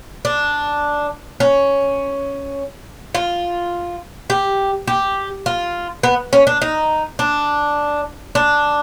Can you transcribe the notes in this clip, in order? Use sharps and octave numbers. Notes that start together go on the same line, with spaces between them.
D4
C#4
F4
G4
G4
F4
B3
C#4
D4
D#4
D4
D4